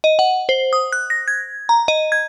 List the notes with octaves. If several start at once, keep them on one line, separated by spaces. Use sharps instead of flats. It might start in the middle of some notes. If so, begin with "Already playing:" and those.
D#5
F#5
C5
D#6
F#6
A#6
G#6
A#5
D#5
G#6